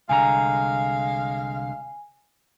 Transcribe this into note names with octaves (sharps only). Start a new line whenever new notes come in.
C2 D3 G#3 F5 G#5 A#5